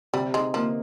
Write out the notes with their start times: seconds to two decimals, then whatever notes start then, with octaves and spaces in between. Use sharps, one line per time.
0.13 C3 G3
0.34 G#3 D#4
0.54 F3 A#3